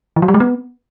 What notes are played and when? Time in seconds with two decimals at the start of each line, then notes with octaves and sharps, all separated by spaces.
0.16 E3
0.22 F#3
0.28 G3
0.34 G#3
0.40 B3